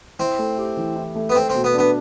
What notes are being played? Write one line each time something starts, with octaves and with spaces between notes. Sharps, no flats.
C4 E4
A3
G4
E3
E4
A3
B3
A3 C4
C4
B2
B3
B3 D4